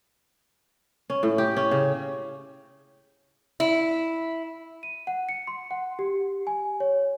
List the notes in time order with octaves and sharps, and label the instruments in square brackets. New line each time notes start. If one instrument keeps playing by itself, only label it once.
[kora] C#4
A2
G4
C#4
C#3
[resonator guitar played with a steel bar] E4
[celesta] D#7
F#5
C#7
C6
F#5
G4
G#5
C#5